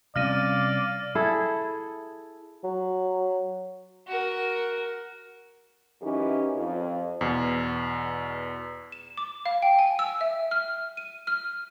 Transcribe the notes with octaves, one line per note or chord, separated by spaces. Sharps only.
C3 G3 C#4 D5 F5 F6 A#6 D#7
E4 G#4 A4
F#3
F#4 A#4
F#2 E3 C#4 D#4 E4 G4
F2
E2 B2
E7
D6
F5
G5
G#5
E6
E5
F6
D#7
F6